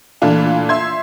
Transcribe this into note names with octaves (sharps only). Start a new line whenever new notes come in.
A#2 E3 A3 D4 F4
E5 C6 G#6